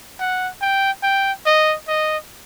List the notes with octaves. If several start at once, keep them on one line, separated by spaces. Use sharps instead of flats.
F#5
G5
G5
D#5
D#5